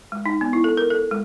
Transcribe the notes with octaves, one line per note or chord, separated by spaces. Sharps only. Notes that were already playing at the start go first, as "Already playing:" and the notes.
G#3
D#4
B3
E4
A4
A#4
A4
G#3